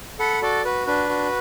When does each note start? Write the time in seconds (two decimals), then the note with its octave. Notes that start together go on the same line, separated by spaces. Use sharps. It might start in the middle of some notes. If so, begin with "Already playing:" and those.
0.19 A4 F#5 B5
0.42 F#4 A4 D5
0.65 F#4 B4
0.87 D4 B4
1.09 F#4